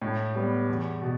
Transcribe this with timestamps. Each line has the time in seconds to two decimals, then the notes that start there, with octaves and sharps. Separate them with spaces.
0.02 A2
0.35 G3 B3
0.69 E2
1.02 B2